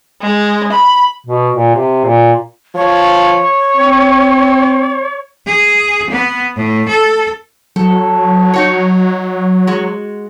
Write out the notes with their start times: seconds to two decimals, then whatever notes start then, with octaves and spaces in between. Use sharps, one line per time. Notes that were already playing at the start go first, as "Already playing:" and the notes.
0.21 G#3
0.72 B5
1.26 B2
1.54 A#2
1.75 C3
2.05 A#2
2.75 F3 C#5
3.76 C4
5.46 G#4
6.10 B3
6.56 A2
6.88 A4
7.76 F#3 A4
8.54 D#4 F#4 C#5
9.67 G#3 F#4